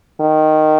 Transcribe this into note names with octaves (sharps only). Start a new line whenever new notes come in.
D#3